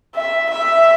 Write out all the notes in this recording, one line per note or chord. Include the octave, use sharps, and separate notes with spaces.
E5
E5